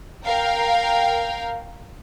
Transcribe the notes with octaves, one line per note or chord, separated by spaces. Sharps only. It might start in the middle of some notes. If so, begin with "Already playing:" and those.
A#4 F5 G5